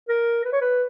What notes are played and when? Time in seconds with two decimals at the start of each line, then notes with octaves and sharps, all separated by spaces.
0.09 A#4
0.45 B4
0.53 C#5
0.61 B4